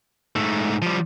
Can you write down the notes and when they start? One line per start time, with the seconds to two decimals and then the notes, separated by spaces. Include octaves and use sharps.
0.36 G#2 A3
0.82 F3 G3